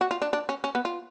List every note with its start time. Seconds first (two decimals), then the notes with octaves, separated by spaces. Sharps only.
0.01 F#4
0.11 F4
0.22 D4
0.33 D4
0.49 C#4
0.64 C#4
0.75 B3
0.85 F4